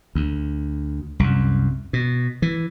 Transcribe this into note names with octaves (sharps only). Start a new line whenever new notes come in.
D2
C2 F#2
B2
E3